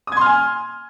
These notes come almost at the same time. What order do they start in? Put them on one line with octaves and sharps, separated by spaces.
D#6 G#6 C6 F6 G#5